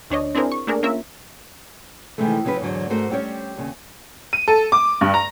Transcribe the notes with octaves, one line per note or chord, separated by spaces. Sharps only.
D2 D4 C#5 D#5
C4 D4 E4 G#4 A#4 C5
C#6
A3 A#3 D4 G#4 A#4
A#3 C#4 F4 A#4 E5
C3 D#3 E3 G#3 A3
C#3 F#3 C4 C#4 B4
E2 G#2 D3 F#3
G#2 A3 C4 F#4 A#4 C5
G3 C4 C#4 G4 C#5
D#2 C#3
D#7
A4
D6
G2
A#5